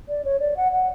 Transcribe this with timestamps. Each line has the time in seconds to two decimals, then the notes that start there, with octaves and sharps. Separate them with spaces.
0.09 D5
0.25 C#5
0.40 D5
0.57 F#5
0.72 F#5